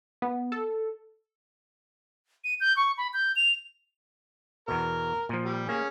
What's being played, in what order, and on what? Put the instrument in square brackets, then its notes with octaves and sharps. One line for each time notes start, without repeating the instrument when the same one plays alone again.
[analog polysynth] B3
A4
[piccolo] D#7
G6
C#6
B5
G6
F7
[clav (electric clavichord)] E2 B2 [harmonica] A#4
[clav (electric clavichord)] A#2 F3
[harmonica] G3
[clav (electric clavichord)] A#3 [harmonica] C#4 G#4